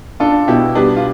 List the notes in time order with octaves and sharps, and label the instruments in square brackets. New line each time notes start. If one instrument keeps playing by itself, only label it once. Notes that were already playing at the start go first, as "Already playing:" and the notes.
[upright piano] D4 [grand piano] F4 A4
[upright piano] B2 [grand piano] E4 G4
[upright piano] G3 [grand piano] B3 D4
[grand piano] F4